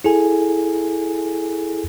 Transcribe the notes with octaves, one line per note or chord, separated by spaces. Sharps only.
E4 G#4 A4 G#5